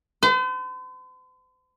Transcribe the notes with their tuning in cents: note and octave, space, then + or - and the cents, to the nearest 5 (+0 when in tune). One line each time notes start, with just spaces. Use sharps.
C5 -45